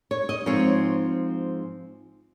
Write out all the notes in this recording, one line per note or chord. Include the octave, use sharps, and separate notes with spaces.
C#5
D#5
G#2 F3 C4 C#5